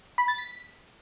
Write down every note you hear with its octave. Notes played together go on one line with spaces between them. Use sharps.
B5
A6
B6